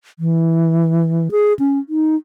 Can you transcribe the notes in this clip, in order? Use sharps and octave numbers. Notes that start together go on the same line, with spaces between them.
E3
G#4
C#4
D#4